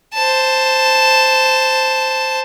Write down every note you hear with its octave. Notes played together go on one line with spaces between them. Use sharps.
C5 A5